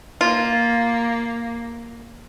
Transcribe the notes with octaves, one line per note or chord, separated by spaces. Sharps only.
A#3 F4